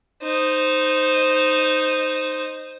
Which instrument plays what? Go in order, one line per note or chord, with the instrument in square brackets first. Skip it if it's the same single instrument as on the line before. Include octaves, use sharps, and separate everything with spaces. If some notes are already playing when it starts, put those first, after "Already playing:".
[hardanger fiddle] D#4 C5